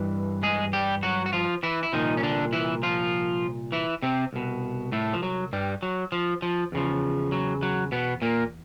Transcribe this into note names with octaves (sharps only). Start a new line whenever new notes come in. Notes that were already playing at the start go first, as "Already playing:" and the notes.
Already playing: G2 E3
G#3 G#4
G3 G4
F#3 F#4
F#4
F3 F4
E3 E4
E4
C2 A#2 D#3 F3 D#4
C#4
D3 D4
E3 E4
F3 F4
E3 E4
C3 C4
C2 B2
A2 A3
F3
F#3
G2 G3
F#3
F3
F3
E2 C#3 F3
F#3
F#3
B2 B3
A#2 A#3